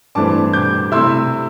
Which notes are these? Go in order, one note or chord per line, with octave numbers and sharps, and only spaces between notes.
G2 E3 A3 C4 A5 D6
D6 G6
C3 A3 E4 C6 E6